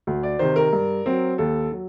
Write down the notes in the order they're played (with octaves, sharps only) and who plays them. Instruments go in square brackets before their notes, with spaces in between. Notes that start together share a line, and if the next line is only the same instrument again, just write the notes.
[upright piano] D2
D5
C3 D#3 C5
A#4
G2
F#3 C4
D#2 A4
F#3